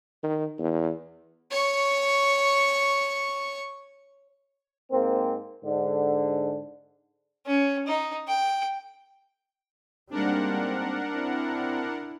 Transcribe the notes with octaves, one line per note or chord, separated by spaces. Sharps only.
D#3
E2
C#5 C#6
G#2 A#3 C4
G#2 D3
C#4
D#4
G5
G#2 G3 A#3 C4 D4 A#4 F#5
C4 E4